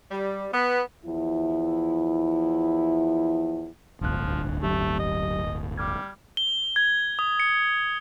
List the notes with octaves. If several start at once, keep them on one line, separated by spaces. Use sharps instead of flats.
G3
B3
E2 F3 E4
D1 G1 C#2 G2 F3 F#6
F#3 A3 G4
D#5
G3 D6 F6 G#6
G7
G#6
D#6
C#7